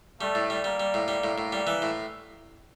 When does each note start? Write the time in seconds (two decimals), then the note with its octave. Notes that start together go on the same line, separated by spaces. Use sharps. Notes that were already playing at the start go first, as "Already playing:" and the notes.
0.21 G3 A3
0.35 A2
0.50 G3
0.64 G3 A#3
0.80 G3
0.94 A2
1.08 G3
1.24 A2
1.38 A2
1.52 G3
1.67 E3
1.82 A2